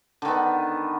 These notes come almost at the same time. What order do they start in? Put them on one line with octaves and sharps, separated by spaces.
D3 D#3 B3